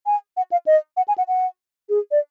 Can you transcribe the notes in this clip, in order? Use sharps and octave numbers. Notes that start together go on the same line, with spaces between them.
G#5
F#5
F5
D#5
F#5
G#5
F#5
F#5
G#4
D5